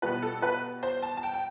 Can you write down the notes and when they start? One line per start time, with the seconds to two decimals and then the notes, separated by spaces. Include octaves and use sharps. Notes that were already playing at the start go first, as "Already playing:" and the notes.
0.02 B2 G3 B3 B4
0.22 A4
0.42 B4
0.83 C5
1.02 A5
1.17 A5
1.23 G5
1.34 G5